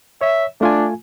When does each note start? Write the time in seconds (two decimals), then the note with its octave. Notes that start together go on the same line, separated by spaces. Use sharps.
0.21 C#5 E5
0.61 A3 D4 F4 G#5